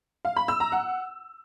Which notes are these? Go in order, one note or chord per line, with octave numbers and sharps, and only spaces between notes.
F5
B5
E6
A#5
F#5